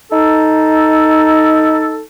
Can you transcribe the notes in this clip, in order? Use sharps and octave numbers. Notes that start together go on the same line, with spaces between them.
D#4 A4